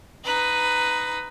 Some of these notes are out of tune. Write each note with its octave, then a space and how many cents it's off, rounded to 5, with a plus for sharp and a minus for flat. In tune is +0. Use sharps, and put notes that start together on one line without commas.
D#4 +0 B4 +10